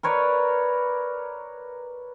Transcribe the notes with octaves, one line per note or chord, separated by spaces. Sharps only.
A#4 B4 C#5 D5